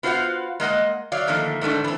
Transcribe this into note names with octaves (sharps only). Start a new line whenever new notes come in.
B3 F4 F#4 C5 F5 F#5
G#3 A#3 D#5 F#5
F#3 C#5 D5 F5
D3 D#3 F3 A3 A#3
G#2 D#3 A3 D4
E3 C4